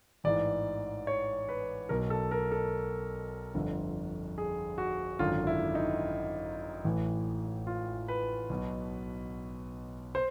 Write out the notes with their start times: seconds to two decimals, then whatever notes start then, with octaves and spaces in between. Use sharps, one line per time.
0.24 A1 G#2 E3 D5
1.07 C#5
1.49 B4
1.89 B1 B2 A#4
2.10 A4
2.31 A#4
2.52 A4
3.55 G1 F2 D3
4.38 G#4
4.78 F#4
5.19 G#1 F#2 D3 F4
5.47 E4
5.75 D#4
6.84 A1 A2 E3
7.67 F4
8.08 B4
8.49 B1 B2
10.15 C5